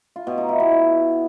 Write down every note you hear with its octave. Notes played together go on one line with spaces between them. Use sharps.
F4
B2
D#4
E4
B2